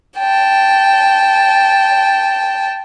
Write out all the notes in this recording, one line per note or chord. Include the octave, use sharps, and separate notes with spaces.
G5 A5